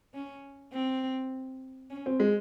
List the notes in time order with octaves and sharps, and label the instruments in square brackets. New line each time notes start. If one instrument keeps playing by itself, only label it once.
[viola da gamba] C#4
C4
C#4
[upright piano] C4
G#3